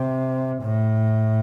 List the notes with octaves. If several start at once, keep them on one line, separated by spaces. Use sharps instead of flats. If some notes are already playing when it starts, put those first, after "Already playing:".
Already playing: C3
A2